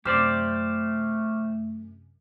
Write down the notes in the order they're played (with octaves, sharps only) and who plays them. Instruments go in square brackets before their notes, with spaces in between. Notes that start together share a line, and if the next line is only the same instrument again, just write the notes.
[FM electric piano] F#2 C3 [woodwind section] A3 [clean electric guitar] G4 C5 D5 [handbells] D6 F6